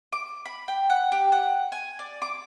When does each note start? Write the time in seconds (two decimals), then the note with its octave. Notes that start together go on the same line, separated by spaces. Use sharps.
0.12 D6
0.46 B5
0.68 G5
0.90 F#5
1.12 G4
1.32 F#5
1.72 G#5
1.99 D5
2.22 D6